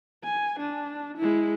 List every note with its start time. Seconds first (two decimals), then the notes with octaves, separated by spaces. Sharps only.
0.24 G#5
0.60 D4
1.18 G#3 E4